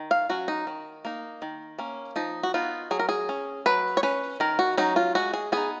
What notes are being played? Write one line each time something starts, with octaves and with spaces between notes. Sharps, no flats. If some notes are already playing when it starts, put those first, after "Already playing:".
Already playing: D#3
F5
F#3 C#4 F#4
D#4
D#3
A#3 D#4
D#3
A#3 C#4
F3 D#4
F#4
B3 D#4 F4
F#3 G#4
A#4
G#4
C#4
F#3 B4
C#5
C#4 B4
D#3 A#4
F#4
F#3 C#4 D#4
F4
G#3 F#4
G#4
B3 D#4 G#4